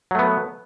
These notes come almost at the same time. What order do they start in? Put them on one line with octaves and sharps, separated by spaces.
F#3 A3 B3